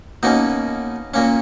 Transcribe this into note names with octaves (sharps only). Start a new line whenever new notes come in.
B2 A#3 C#4 D#4
A#2 A#3 C#4